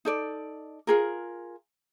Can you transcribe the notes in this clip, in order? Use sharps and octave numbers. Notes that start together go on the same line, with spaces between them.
D#4 A4 D5
F4 G#4 A#4